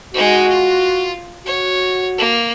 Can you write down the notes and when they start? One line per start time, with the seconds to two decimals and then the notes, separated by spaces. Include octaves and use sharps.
0.14 G#3 D#4 F#4
0.48 F4
1.46 F#4 C#5
2.18 A#3